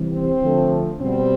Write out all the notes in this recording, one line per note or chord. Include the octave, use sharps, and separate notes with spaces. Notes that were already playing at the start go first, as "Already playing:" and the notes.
Already playing: C3 E3 G3
C4
D3 F3 A3
B2 G3 B3 C4